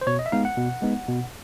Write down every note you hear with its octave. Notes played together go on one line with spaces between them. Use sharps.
C5
B2 C#5
D#5
E5
G#3 B3 D#4 F5
F#5
B2
G#3 B3 D#4
B2